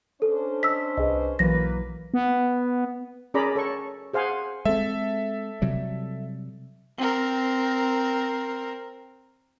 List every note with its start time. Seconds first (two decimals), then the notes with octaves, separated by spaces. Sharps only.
0.22 C#4 D4 A4 C5
0.63 D#5 E6 B6
0.97 C2 G#4 B4 D#5
1.39 B1 E3 F#3 A#3 B4 A#6
2.14 B3
3.34 C#4 G#4 A#4 D5 A#5 B5
3.56 A4 C#5 C#6
4.13 G#4 C5 F5 F#5 G#5
4.65 G#3 C4 A4 E5
5.62 C3 F#3 G3
6.98 C4 A#4